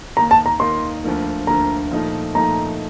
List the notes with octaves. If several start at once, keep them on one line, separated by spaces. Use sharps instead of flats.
D#2 D#3 A#3 D#4 A#5
A5
A#5
D#2 D#3 A#3 D#4 C6
D2 D3 F3 A#3
D2 D3 F3 A#3 A#5
A#2 F3 A3 D#4
A#2 F3 A3 D#4 A#5